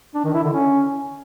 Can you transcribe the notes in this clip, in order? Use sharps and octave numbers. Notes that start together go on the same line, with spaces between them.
D4
D#3
E4
D3
C#4